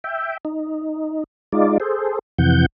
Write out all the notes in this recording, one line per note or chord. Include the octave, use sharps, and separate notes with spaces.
E5 G5
D#4
G#3 D#4 F4 D5
G#4 A4 C5
F2 C3 E3 F#5 G6